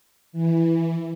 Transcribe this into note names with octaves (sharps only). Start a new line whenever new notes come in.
E3